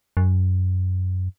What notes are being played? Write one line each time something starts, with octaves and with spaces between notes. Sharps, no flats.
F#2